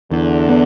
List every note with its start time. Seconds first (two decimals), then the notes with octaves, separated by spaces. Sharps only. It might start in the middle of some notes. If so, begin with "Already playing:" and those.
0.11 E2 D3
0.49 B3